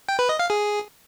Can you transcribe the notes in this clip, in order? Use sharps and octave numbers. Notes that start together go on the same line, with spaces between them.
G5
B4
D#5
F5
G#4